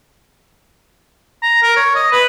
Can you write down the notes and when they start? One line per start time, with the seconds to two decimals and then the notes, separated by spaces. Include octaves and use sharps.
1.42 A#5
1.62 A#4
1.76 C#5
1.95 D#5
2.11 B4